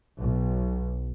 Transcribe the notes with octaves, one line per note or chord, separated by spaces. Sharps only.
B1